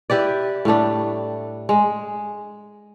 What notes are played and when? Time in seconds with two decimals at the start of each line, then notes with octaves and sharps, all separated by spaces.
0.10 E4 G4 B4 D5
0.65 A2 G3 A3 D4
1.69 G#3